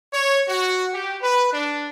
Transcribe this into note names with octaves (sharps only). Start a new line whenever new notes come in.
C#5
F#4
G4
B4
D4